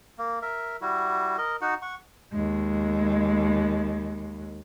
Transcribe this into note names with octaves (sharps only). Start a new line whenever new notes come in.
A#3
A#4 E5
G3 E4 F#4
A#4 D#5
D#4 F#4 F#5
F#5 C#6
D#2 G#3